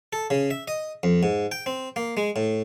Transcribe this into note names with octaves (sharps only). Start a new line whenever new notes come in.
A4
C#3
E5
D#5
F2
G#2
G5
C4
A#3
G#3
A2